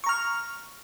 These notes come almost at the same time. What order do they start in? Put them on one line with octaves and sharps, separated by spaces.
C#6 A#5 F6